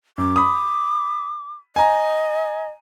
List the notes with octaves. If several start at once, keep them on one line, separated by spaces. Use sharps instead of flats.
F#2 D6
B5 D#6
D#5 G#5 A#5